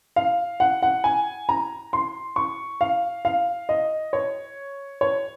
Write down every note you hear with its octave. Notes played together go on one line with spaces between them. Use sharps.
F5
F#5
F#5
G#5
A#5
C6
C#6
F5
F5
D#5
C#5
C#5